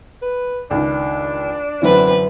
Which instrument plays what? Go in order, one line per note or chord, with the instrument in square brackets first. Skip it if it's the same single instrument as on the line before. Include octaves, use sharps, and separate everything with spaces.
[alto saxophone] B4
[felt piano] C#2 D#3 [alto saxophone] D4
[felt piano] F#2 D3 E3 [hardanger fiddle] C4 B4